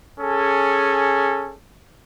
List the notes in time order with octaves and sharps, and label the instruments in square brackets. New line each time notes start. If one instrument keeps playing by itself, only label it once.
[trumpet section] C#4 G#4 A4